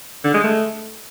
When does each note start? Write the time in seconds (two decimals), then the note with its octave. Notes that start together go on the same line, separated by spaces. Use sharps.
0.24 D3
0.34 G#3
0.44 A3